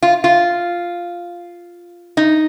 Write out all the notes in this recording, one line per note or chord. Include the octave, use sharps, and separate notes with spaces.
F4
F4
D#4